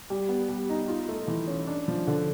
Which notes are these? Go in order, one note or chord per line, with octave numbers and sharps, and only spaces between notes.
G3
B3
G3
D#4
F4
A3
E3
C#4
D4
F3
D3